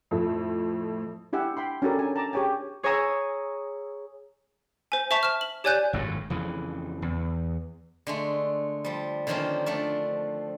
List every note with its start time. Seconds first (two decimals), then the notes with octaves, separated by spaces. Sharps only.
0.11 F2 A2 A3
1.33 D4 E4 G4 E5 F#5 G#5
1.57 G5 B5 C6
1.82 C#4 D4 F#4 G4 A4 A#4
1.99 G#5
2.16 A5 A#5 D6
2.33 G4 G#4 C#5 G5 G#5
2.83 G#4 C#5 G#5 A#5 D#6 E6
4.92 C5 G#5
5.11 C5 E5 A5 C#6 B6 F7
5.23 F6 E7
5.41 F#7
5.64 G4 C#5 D5 G#5 F#6 G6
5.93 G#1 F#2 A2
6.30 F2 C#3 E3
7.02 E2
8.07 D3 G#3 A3
8.85 F3 G3
9.27 D3 D#3 F3 A#3 C4 C#4
9.66 F3 A3 D4